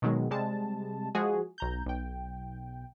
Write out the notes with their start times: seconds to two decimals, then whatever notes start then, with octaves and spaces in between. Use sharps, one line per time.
0.02 B2 D#3 F#3 G#3
0.31 C3 G3 G#3 A5
1.15 F3 G#3 F#4 G#4
1.58 B1 A#5 G6
1.86 B1 G5